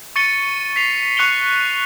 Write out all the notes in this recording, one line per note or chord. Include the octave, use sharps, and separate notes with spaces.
C#6 A6 C#7 D#7 G7
B6 C7 F7
C#6 F#6 C#7 F7 G7